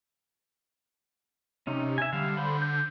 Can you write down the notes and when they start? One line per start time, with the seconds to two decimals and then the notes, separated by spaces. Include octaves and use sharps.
1.67 C3 C#4 D#4
1.98 E5 G#5
2.13 D3 G3 F5
2.37 C5 B5
2.62 G6